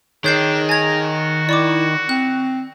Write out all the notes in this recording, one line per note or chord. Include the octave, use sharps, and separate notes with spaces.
D#3 D4 D#4 G#4 C#5 G6 C7
G#5 A#5 G#6
F#4
E4 D5 C#6 D6
C4 F#6